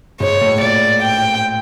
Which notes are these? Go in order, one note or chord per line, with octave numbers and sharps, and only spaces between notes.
G#2 C#5
A2
A#2 D5
G5